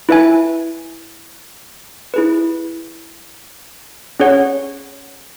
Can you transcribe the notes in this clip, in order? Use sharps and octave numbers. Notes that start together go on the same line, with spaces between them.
E4 B4 E5 G#5
E4 G#4 B4
C#4 G#4 C#5 F#5